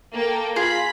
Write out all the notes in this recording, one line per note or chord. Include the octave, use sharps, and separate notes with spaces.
A#3 A4 G5
F4 G#4 A#5 B5 B6